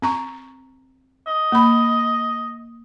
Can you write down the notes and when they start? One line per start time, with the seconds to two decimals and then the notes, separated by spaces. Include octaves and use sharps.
0.02 C4 A#5 C#6
1.27 D#5
1.52 A#3 B5